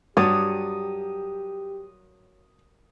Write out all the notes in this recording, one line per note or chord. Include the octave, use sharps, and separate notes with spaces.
G2 F#3 G4 C#5 D5 D#6